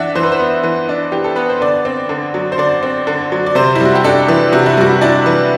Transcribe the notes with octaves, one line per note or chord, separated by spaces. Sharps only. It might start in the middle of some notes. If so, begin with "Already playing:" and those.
Already playing: E3 D4 E5 F#5
E3 C5
B4
C5
B3
E3
D4
E3 G4
A4
B3 B4
C5
D3 D5
C4
D3
F#3
C5
D3 D5
C4
D3
F#3
D5
C3 C5
E4
G3 F#4
G4
D4 A4
E3
C3 F#4
E4
G3 F#4
D4 E4
E3